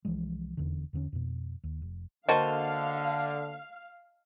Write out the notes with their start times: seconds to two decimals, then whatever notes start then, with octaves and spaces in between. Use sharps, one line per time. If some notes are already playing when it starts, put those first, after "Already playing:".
0.05 C2 E3 F3 G#3
0.57 F1 E2 D3
0.93 E2 D3 A#3 C#4
1.12 F2 B2
1.64 D#2
1.82 F1
2.29 D3 A#3 F#4 C5 D#5 F5 A5